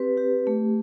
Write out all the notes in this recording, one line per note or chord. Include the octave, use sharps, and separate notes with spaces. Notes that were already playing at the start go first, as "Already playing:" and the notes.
Already playing: C4 G4 B4
G4
A3